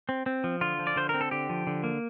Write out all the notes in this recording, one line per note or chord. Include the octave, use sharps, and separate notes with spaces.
C4
C4
F3
D3 F4
F3
D5
D3 C5
C4 A#4
A4
D3 G4
F3
D3
A#3